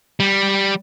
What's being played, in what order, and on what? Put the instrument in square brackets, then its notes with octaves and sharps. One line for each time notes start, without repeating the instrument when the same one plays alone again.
[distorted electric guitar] G3